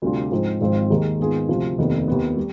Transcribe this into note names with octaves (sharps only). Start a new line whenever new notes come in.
D2 C3 G3 D4 F4
G#2 F3 C4 F4 G#4
G#1 G#2 F3 C4
D#2 D#3 G#3
G#2 D#3 B3 F4 G#4
D2 C3 F3
F1 D#2 D#3 B3
D#2 D#3 B3
G3